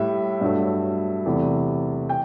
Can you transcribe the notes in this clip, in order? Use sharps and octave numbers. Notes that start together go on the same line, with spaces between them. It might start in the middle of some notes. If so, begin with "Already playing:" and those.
Already playing: A2 G3 E5
G2 F#3 A3
E2 C3 E3 A3
G5